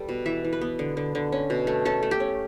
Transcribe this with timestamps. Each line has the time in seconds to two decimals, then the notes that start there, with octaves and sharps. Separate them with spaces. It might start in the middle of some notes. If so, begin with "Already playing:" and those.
Already playing: G3 B3 A4
0.09 B2
0.26 E3 E5
0.44 E3
0.53 B4
0.61 B3
0.79 D3
0.97 D3
1.15 D3
1.32 C#4
1.50 B2
1.67 A3
1.85 C#4 A4
2.03 A3
2.11 G4
2.20 C#4